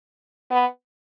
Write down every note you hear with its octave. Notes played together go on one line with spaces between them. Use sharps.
B3